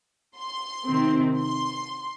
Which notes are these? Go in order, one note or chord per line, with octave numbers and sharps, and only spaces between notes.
C6
C3 D#3 C4
C6